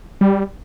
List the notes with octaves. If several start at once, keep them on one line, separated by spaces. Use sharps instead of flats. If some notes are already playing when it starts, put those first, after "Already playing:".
G3